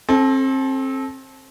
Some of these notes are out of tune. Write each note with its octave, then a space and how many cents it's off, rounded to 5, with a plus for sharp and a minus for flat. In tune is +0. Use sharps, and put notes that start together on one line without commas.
C4 +30 A4 -25